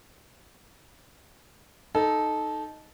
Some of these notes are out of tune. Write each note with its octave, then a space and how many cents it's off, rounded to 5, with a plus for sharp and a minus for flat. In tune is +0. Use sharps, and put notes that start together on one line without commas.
D#4 +0 A4 -15